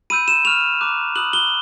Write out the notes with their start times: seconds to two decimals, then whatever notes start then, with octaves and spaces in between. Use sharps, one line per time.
0.10 B5 E6 G6 D#7
0.28 E7
0.45 C#6 F6 F7
0.81 A#5 D6 F#6
1.16 B5 D#6 F#6 F#7
1.33 G7